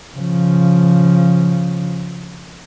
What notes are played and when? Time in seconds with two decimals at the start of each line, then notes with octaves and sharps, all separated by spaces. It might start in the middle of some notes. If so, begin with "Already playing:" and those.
0.17 C#3 F3